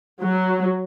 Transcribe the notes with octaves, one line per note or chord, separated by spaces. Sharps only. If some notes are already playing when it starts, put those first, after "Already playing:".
F#3